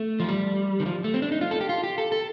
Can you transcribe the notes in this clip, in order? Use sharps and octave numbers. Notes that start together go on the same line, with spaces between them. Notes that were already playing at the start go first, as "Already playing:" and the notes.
Already playing: A3
F3
G3
D#3
F3
A3
C4
D4
D#4
F4
A4
G4
F4
G4
A4
A4